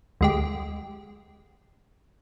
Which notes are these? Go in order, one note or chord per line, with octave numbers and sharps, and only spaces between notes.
D2 G#3 G4